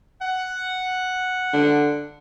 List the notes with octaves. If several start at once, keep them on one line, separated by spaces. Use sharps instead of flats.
F#5
D3